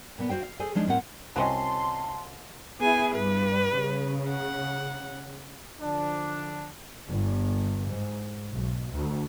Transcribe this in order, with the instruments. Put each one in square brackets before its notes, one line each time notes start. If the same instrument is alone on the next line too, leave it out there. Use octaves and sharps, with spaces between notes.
[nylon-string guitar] A#2 B3
F#4 C5 F5 G5
F5
G#4 A4 C5 G#5
F3 G#3 D4 D#4
A2 C4 A#4 F#5
[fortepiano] C2 D#5 [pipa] F#3 C4 C#4 [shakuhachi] A5 [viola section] C6
[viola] B3 G#5 [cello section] E4 G#4
[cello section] G2 G3 [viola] B4
[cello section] C#3
[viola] F#5
[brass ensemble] D3 F3 D4
[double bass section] G1
G#2
B1
D2